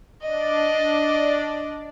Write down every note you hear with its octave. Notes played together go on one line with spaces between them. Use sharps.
D4 D5 D#5